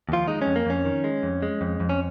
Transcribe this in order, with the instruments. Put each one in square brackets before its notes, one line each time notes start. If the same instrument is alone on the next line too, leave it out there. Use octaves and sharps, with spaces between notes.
[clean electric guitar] D#2 F3 F4
G#3 D#4
C#4
F2
A#3
F2 C#4
D#3
G#3
F2
G#3
F2
F2
C#4